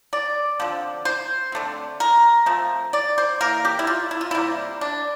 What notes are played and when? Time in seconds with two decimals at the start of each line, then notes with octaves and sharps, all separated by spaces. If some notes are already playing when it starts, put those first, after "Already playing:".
0.13 D5
0.60 D3 F3 C4
1.05 C5
1.52 D3 A3 C4
2.00 A#4
2.46 F3 A3 C4
2.93 D5
3.18 C5
3.41 E3 A#3 A#4
3.65 G4
3.79 E4
3.87 F4
4.11 E4
4.21 F4
4.31 C3 G3 A#3 E4
4.81 D4